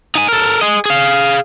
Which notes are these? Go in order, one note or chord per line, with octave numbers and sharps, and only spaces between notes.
D#4 G#5
A4 A#4
G#4 D#5
G#4 F5